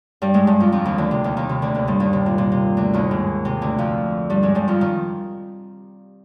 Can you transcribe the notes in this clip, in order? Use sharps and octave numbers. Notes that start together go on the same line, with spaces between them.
G2 G3
G#2 G#3
G2 G3
F2 F3
F2 F3
D#2 D#3
D2 D3
C3
D#2 D#3
D#2 D#3
C3
D2 D3
D#2 D#3
G2 G3
D#2 D#3
C3
A#2
A#2
C3
D2 D3
D#2 D#3
G#2
C3
D2 D3
F2 F3
G2 G3
G#2 G#3
G2 G3
F2 F3
D#3